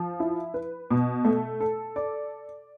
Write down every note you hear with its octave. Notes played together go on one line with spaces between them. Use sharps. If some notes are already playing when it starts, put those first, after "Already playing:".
Already playing: F3
E4
B4
B2
A3
A4
D5